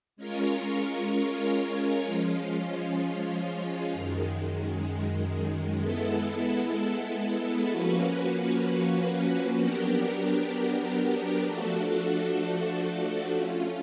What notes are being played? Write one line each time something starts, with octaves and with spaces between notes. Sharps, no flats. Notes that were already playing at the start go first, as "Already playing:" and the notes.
G#3 C#4 F4 A#4 C#5
F3 G#3 C#4 F4
F#2 D#3 G#3
G#3 B3 E4 A4
F3 A#3 C#4 F#4 B4
F#3 B3 D4 G4 A#4
F3 A3 D4 F#4 A4
A3 C#4 F4